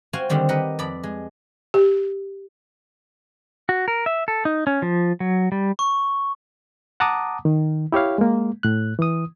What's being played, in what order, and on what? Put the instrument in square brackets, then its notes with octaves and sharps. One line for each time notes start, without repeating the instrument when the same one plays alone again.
[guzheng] F#4 C5 F5 G5 G#5
D3 D#3 G3 C4
G4 A#4 B4 D#5 F#5
F2 D5 B5
G#3
[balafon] G4
[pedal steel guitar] F#4
A#4
E5
A4
D#4
C#4
F3
F#3
G3
[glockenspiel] C#6
[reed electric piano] F#5 A5 A#5 D6 D#6
D#3
E4 G4 C#5 F5
G#3 A#3
A2 F#6
E3 D#6